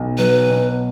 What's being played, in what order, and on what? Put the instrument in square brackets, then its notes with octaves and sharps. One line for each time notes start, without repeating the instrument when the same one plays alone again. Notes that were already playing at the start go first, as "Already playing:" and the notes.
Already playing: [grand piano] B1
[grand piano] F#3 [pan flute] B4
[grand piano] B2